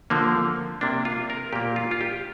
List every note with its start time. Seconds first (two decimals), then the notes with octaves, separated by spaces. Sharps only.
0.10 D3 F3 A#3
0.81 C3 A#3 D4
1.05 F4
1.30 A#4
1.53 A#2 A#3 G4
1.76 F4
1.91 F4
2.01 G4